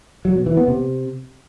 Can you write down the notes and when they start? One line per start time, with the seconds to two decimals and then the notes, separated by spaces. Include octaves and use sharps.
0.25 F#3
0.36 B2
0.46 E3
0.57 B3
0.68 C3